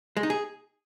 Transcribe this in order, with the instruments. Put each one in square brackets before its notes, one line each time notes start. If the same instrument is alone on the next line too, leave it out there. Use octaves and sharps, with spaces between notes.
[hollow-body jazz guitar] G#3
D#4
G#4